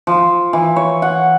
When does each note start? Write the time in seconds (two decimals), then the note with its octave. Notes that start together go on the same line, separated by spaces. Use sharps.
0.07 F3
0.53 E3
0.76 C#5
1.02 F#5